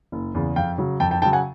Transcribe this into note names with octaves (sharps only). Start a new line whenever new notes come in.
F#1
E2 C#3
F2 F5 G5
C#3 F#3
F2 G5 A5
G5 A5
C#3 F#3 G5 A5
F#5 G#5